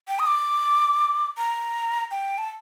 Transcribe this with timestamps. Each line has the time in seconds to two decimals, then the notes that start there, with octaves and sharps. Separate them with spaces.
0.08 G5
0.19 D#6
0.27 D6
1.38 A#5
2.11 G5
2.38 A5